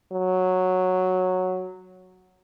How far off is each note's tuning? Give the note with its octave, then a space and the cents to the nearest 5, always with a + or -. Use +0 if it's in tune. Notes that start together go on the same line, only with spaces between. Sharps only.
F#3 -5